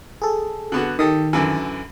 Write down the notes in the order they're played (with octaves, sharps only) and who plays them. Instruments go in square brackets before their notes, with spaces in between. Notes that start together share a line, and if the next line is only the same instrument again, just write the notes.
[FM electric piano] G#4 A4
[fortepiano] D3 B3 F#4
[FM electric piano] D#3 [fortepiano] G4 A4 D#6
[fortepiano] F#2 D3 E3